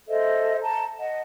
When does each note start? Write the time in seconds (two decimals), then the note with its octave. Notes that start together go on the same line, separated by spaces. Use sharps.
0.08 A4 C5 D#5 E5
0.60 A5 A#5
0.98 D#5 F#5